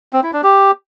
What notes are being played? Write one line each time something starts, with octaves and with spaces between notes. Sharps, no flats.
C4
E4
D4
G4